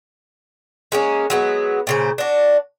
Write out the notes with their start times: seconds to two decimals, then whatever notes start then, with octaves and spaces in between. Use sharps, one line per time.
0.92 G#3 A#3 C#4
1.30 F#3 G#3 B3
1.87 A#2 C#3 C5
2.18 D4 F#4